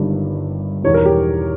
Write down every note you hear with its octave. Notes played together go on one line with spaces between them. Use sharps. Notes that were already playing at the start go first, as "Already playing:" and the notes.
Already playing: G1 G2 D#3 G3
E1 E2 D#3 G3 C#5
A#4
G4